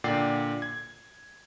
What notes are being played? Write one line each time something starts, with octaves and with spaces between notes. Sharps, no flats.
A#2 D3 D5 F#5 G5 C7
G#6